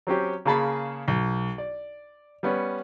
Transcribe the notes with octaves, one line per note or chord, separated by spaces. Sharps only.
F#3 C4 C#4 G4
C#3 A#3 G#4 A5 B5 C#6
B1
D5
G3 B3 C#4